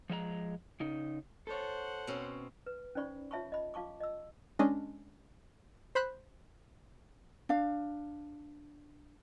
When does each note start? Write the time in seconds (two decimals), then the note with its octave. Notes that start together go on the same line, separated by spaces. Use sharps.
0.10 F3 G#3 E5 A#5
0.80 C#3 D#4
1.47 A4 C5 C#5 F#5
2.07 B2 C4 C#4
2.66 B4
2.95 C#4 D#4 C5 D5 B5 C#6
3.31 F4 C#5 E5 A5 B5 C#6
3.52 D#5 B5
3.74 F4 F5 A5 C#6 D6
4.00 D#5 E6
4.59 G#3 C#4 D4 D#5
5.95 C5 B5 F#6
7.49 D4 F5